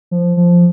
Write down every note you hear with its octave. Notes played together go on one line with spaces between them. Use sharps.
F3
F3